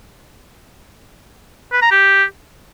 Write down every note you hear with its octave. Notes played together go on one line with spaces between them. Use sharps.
B4
A#5
G4